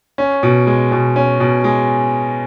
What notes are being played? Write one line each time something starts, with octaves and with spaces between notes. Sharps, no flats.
C#4
B2
G#3
B2
C#4
B2
G#3